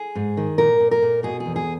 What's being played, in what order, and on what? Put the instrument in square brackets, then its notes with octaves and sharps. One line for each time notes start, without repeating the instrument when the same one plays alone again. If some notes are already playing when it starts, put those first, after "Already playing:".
Already playing: [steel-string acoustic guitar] G#4
G#2
D#3
A#2 A#4
A#2
A#4
A#2
B2 G#4
G#4
E2
G#4